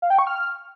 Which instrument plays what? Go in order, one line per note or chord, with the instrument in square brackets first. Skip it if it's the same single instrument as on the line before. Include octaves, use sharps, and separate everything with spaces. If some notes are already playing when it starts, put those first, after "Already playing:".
[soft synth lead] F5
G5
C#6
F6